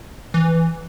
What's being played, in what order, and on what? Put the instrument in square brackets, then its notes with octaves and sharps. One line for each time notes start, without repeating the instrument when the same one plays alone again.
[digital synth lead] E3